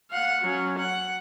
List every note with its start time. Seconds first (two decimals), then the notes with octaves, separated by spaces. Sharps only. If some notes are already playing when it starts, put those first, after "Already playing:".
0.11 F5 F#5
0.41 F#3 C#4
0.78 F#5